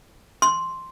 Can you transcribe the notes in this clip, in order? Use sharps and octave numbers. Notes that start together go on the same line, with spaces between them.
C6